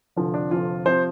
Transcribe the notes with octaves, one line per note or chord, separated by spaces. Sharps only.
F1 F2 D3 F3
D4
F1 F2 D3 F3 F4
C3 F3 C5